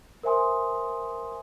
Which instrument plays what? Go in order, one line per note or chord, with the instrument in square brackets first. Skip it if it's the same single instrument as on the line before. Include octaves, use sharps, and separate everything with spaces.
[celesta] A#4 C5 E5 G#5 C6 D#6